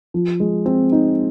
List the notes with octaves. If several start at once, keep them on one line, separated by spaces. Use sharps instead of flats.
F3
G#3
C4
D#4